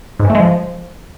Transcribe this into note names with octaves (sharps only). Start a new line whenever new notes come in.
G#2
E3
A3
G#3
F3